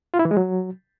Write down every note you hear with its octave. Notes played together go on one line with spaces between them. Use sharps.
F4
E4
E3
G#3
F#3